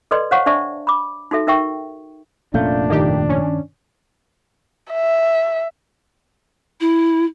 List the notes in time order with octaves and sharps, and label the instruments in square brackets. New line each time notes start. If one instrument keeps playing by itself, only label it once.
[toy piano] A4 B4 D5 D#5 C6
C5 C#5 F5 F#5 C#6
D4 C5 D5 E5 A5 C#6
B5 D6
D#4 F#4 A4 E5
D#4 A#4 E5 G5 C#6
[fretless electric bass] F1 A#2 A3 [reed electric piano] C#4 F5 G6 [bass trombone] D4
[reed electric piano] G2 D#3 [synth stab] A#3 D#4 G4
[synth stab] C#4
[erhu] E5
[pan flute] E4